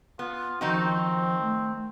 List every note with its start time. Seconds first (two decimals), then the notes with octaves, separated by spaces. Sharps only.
0.19 B3 F4
0.61 D#3 F3 C4 D#4 F#4
1.42 A3